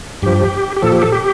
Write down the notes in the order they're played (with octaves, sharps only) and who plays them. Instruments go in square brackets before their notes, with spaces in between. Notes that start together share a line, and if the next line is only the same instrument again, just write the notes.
[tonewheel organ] G2 F3 G4
G4
A#2 F3 A4
G4
A4
G4